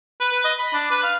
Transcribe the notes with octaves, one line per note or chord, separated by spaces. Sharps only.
B4
B4
D#5
B5
D4
B4
F5